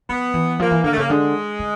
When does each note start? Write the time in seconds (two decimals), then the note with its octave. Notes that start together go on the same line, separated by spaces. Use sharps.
0.09 F3 B3
0.34 E3
0.59 F3 A#3
0.71 E3
0.84 D3 A#3
0.92 A3
0.97 C#3 A#3
1.09 D3 G#3
1.59 D3